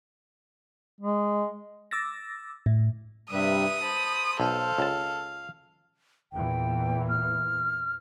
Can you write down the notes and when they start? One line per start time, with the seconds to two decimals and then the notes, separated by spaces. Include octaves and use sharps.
1.00 G#3
1.91 D6 E6 A6 A#6
2.66 A2
3.31 G2 C3 G3 B4 E5 D#6
3.83 C5 A5 B5
4.40 B1 A4 F5
4.78 C#2 A5
6.32 E2 A#2 E3 G5
7.09 F6